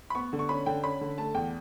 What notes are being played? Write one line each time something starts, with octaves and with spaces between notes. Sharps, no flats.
B5
B3 C#6
D3
C#6
C#4 B5
D3 G5
C#4 B5
D3
A3 A5
E2 G5